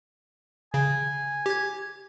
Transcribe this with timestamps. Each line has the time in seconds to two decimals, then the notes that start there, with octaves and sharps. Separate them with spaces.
0.74 C#3 G#5
1.46 G4 G#6